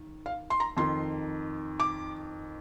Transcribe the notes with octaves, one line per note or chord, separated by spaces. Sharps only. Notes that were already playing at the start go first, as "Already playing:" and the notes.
Already playing: D#3
F5
C6
A#5
F2 D#3 C6
D6